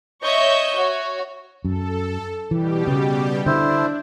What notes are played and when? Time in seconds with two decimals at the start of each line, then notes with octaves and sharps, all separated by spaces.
0.24 C#5 D#5 E5 C#6 G6
0.77 F#4 C#5
1.65 F#2 A4
2.51 B2 E3 G3 G4
2.87 C#3
3.46 D3 D4 E4 C5